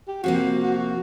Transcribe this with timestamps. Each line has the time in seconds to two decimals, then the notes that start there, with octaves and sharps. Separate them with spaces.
0.08 G4
0.24 C3 F3 A#3 F#4
0.63 F#4